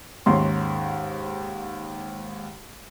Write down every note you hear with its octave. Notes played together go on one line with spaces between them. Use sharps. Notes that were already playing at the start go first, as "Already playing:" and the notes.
D#2 G#2 C#4 C6